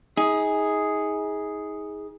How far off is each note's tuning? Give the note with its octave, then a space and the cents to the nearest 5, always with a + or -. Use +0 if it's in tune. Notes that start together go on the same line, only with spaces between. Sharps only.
D#4 +35 G#4 +0